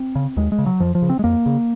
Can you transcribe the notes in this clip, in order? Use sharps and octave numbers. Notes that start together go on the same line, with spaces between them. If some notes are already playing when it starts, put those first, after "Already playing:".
Already playing: C4
C#3
D#2 G#3
G#3
C#3
F#3
F2 F3
F3
C#3
C4
G#3
F2 A#3
C#3